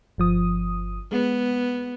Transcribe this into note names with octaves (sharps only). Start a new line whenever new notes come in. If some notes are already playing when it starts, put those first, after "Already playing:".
G1 F3 D#6
G#3 B3